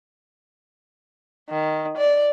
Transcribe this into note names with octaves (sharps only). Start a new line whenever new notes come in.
D#3
D5